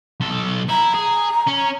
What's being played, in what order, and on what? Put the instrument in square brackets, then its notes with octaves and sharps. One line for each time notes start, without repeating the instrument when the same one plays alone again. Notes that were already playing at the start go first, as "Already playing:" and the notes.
[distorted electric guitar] B1 A4
[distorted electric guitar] E4 [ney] A#5
[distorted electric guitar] G#4
C#4